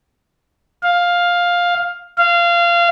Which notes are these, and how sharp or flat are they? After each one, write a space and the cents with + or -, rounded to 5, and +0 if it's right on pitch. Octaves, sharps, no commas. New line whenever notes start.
F5 +10
F5 -20